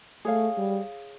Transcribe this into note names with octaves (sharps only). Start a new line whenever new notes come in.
A3 G#4 C#5 F5
G3